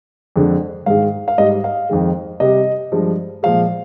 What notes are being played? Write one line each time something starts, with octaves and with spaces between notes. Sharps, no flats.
F2 D3 G#3
G#2 D#3 G#3 F5
F5
G#2 G3 D#5
F5
F2 D#3 G#3
C3 G3 D#5
G2 F3 G#3
A#2 F3 G#3 F5